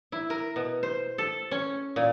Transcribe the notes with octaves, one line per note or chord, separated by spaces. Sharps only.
E4
A#4
B2
C5
A4
C#4
A#2